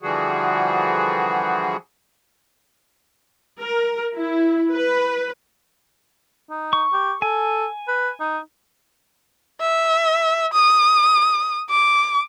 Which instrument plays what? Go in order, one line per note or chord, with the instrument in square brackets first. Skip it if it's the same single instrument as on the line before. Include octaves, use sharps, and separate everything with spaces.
[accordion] D3 E3 F3 G3 F#4 G#4
[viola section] A#4
E4
B4
[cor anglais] D#4
[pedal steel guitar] C#6
[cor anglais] G4
[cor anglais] A4 [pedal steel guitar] G#5
[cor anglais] B4
D#4
[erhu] E5
D#6
D6